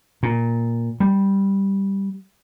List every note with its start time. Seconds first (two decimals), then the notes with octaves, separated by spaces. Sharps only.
0.23 A#2
1.00 G3